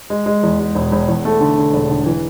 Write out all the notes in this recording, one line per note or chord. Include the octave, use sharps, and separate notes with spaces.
G#3
G#3
E2
G#3
E1
E1
E2
A3
D3
D3
E1
D3
E3